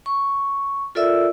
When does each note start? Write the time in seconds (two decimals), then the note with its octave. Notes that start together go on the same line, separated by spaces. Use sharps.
0.06 C#6
0.95 F4 A4 A#4 D5 E5 E6